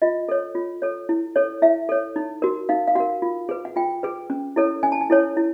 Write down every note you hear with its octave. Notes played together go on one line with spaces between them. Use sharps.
F4 D#5
A4 C#5
F4
A4 C#5
E4
A4 C#5
E4 E5
A4 C#5
D#4
F#4 A#4
D#4 F5
F5
F#4 A#4 F#5
F4
G#4 B4
F#5
F4 G5
G#4 B4
C#4
E4 A4 C#5
C#4 G#5
A5
G#5
E4 A4 C#5
E4